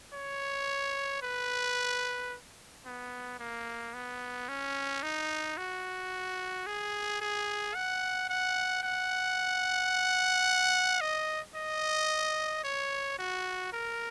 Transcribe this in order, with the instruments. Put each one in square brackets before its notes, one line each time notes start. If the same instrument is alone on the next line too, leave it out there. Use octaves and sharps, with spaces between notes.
[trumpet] C#5
B4
B3
A#3
B3
C#4
D#4
F#4
G#4
G#4
F#5
F#5
F#5
D#5
D#5
C#5
F#4
A#4